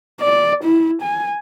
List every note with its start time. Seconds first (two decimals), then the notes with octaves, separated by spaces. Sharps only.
0.21 D5
0.64 E4
1.02 G#5